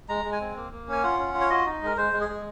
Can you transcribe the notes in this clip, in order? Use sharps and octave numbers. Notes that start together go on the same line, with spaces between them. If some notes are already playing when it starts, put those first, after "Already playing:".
G#3 A#5
G#3
G#5
C4
A#3
A#3
C#4 G#5
F4 F#5
C#4
F4
C#5
F#4 D#5
D#4
G#3 A#4
G#3 C5
G#3
G#4
G#3